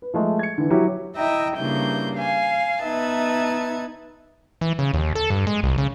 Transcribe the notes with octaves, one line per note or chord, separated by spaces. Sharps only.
B4
F3 G#3 A3
G#6 C#7
D3 E3
F#3 E4 F#4 G4
E4 D#5 E5 G5 A#5
G2 C#3 A#3 E4 G6
F5 G#5
B3 D#4 B4 E5 A5 G#6
E3
C#3
D#2
A4
G2
G#3
C2
C#3